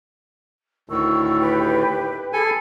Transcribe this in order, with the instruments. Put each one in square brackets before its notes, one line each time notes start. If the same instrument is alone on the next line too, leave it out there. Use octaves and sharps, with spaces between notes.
[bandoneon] D2 A2 D#3 [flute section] C#6 E6
[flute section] G4 B4 G5
[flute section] G#4 A5 B5 [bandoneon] A4 G#5